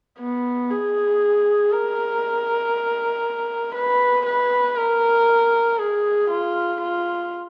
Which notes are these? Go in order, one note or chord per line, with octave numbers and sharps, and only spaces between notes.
B3
G#4
A#4
B4
B4
A#4
G#4
F4
F4